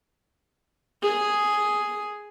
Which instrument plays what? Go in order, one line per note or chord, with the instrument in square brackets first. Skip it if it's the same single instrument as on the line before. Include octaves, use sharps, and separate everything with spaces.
[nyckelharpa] G#4